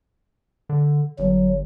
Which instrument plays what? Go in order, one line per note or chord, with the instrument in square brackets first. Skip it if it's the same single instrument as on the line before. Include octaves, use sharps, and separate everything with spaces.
[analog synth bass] D3
[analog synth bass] G1 [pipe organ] F#3